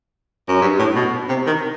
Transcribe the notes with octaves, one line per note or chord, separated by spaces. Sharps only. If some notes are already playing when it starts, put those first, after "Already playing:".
F#2
G2
A2
B2
C3
D#3